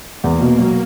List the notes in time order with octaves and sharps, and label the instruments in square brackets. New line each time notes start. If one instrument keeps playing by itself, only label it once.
[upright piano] E2 [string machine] A#3
[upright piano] B2
F#3